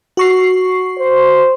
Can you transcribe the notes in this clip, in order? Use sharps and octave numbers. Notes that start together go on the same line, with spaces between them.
F#4 C#6 C7
C5